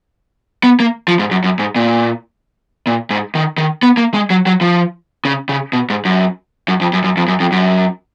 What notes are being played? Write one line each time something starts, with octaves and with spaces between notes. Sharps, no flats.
B3
A#3
F3
G#2
F#2
F#2
G#2
A#2
A#2
G#2
D#3
D#3
B3
A#3
G#3
F#3
F#3
F3
C#3
C#3
B2
G#2
F#2
F#2
F2
F#2
F#2
F2
F#2
F2
F#2